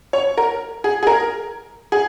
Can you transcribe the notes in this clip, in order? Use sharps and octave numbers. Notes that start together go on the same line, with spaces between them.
C#5
A#4
G#4
G#4
A#4
G#4